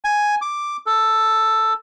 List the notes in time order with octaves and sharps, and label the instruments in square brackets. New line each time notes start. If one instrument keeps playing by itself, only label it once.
[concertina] G#5
D6
A4